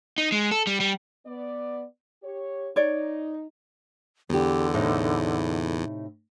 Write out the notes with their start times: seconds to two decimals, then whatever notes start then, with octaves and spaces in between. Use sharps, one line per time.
0.18 D#4
0.32 G#3
0.51 A4
0.67 G3
0.80 G3
1.26 B3 D5
2.23 G4 C#5
2.76 D#4 C#5 D5
4.29 E2 D3 B3 G4
4.74 A2 C3 D#4